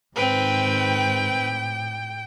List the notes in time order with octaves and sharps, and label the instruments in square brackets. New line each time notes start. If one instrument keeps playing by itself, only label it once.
[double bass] G#2 D#3 [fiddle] C4 B4 [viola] G5
[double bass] A2